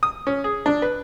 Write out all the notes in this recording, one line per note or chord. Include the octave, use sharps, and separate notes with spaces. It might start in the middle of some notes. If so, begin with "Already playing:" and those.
D#6
C#4
G#4
D4
B4